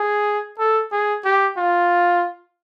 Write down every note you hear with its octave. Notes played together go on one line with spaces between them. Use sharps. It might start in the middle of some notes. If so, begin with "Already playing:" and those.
Already playing: G#4
A4
G#4
G4
F4